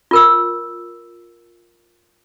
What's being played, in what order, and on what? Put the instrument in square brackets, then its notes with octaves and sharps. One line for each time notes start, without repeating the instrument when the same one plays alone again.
[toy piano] F4 A#4 E6